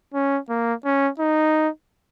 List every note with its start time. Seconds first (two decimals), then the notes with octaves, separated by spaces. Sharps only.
0.14 C#4
0.49 A#3
0.85 C#4
1.19 D#4